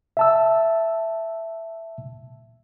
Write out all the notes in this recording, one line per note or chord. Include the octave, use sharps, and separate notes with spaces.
E5 A5 E6